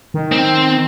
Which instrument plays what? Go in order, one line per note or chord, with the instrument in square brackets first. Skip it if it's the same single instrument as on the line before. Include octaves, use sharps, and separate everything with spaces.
[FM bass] D#3
[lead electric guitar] C4